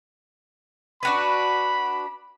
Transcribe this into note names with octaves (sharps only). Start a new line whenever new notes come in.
D4 F#4 B4 B5